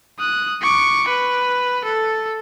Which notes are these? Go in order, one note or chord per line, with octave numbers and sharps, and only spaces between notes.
D#6 F#6
C#6 D6
B4
A4